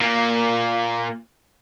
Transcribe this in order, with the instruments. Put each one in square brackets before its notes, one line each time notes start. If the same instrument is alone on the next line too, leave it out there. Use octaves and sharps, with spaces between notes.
[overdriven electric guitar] A#2 A#3